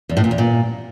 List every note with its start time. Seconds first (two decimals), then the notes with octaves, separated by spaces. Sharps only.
0.09 E2
0.17 A2
0.24 A#2
0.31 E2
0.38 A#2